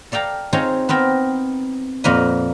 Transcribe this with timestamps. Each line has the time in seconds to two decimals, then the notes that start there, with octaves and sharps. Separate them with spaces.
0.12 A4 D5 F5 G5 A#5
0.53 C4 D#4 F4 G#4 C#5 A#5
0.89 B3 C4 A#4 G5
2.04 F2 A#2 A#3 F#4 B4 D#5